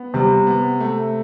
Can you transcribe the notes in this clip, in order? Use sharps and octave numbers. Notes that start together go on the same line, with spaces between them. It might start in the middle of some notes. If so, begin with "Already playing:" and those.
Already playing: B3
C3 G3
B3
A3